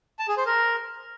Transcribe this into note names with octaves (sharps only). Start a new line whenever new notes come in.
A5
G#4
C5
A#4